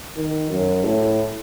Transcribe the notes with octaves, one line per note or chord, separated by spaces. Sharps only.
D#3
F#2
A2